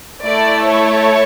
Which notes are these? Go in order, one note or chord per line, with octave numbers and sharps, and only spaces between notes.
A3 E4 A4 D5
C#5